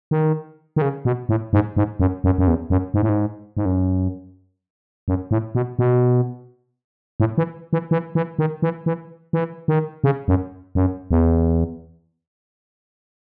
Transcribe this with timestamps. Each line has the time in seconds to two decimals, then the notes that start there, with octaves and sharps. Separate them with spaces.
0.11 D#3
0.76 D#3
0.82 C#3
1.05 B2
1.29 A2
1.53 G#2
1.76 G#2
2.00 F#2
2.24 F#2
2.38 F#2
2.47 E2
2.70 F#2
2.94 G#2
3.03 A2
3.09 G#2
3.57 G#2
3.65 F#2
5.08 F#2
5.31 A2
5.55 B2
5.79 B2
7.20 A2
7.38 E3
7.73 E3
7.91 E3
8.15 E3
8.39 D#3
8.62 E3
8.86 E3
9.33 E3
9.68 D#3
10.04 C#3
10.28 F#2
10.75 F#2
11.11 E2